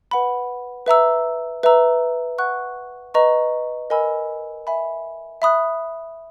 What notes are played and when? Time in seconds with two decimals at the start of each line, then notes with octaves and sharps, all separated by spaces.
0.11 B4 F#5 B5
0.86 B4 E5 A#5 E6
1.63 B4 E5 A#5 E6
2.38 F#5 C#6 F#6
3.14 B4 D#5 A#5 C#6
3.90 A#4 D#5 G#5 B5 E6
4.67 E5 G#5 B5
5.42 E5 B5 D#6 F#6